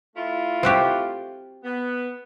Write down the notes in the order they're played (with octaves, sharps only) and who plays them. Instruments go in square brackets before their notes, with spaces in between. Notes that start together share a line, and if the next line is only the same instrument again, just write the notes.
[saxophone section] A3 E4 F4
[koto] C4 F#4 G4
[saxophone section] B3